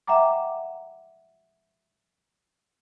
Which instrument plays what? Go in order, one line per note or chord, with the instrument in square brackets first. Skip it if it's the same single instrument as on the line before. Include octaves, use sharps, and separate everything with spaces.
[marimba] E5 F#5 G5 A#5 D6